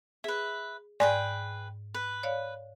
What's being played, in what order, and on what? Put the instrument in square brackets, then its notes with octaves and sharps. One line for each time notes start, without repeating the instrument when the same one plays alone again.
[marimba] G#4 [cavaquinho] B4 E5
[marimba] G#2 [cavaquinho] G#4 B4 G5 [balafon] D5 G#5
[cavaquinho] B4
[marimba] C#5 D5 F5